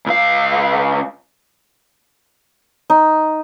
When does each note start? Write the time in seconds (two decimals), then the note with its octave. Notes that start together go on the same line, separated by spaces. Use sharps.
0.06 C#2 F5
2.90 D#4